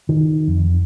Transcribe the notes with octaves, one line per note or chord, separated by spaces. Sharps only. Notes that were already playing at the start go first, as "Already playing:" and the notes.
D#3
F2